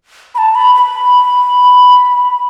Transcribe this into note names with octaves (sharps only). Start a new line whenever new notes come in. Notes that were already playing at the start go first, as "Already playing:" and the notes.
B5
A5
B5
B5